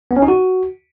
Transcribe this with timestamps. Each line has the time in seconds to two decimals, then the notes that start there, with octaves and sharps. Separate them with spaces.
0.11 B3
0.16 C#4
0.22 D#4
0.28 F#4